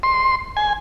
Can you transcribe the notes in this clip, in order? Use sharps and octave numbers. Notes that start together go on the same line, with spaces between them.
C6
G#5